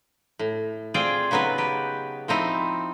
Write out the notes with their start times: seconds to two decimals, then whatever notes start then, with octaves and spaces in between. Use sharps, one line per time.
0.39 A2
0.94 C4 F4 G#4 D5 G5
1.31 C#3 F#3 B3 D#4 B4
1.58 G4 B4
2.28 F3 C4 D#4 E4